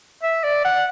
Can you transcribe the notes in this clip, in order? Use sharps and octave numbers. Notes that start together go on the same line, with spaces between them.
E5
D5
F#5